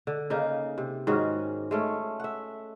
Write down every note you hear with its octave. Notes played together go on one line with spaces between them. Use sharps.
D3
C#3 A#3 D#4
C3
G#2 D#3 C#4 F#4
G#3 A3 C#4
E5 F#5